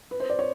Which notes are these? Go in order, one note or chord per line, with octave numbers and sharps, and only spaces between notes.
B4
C5
D5
C#5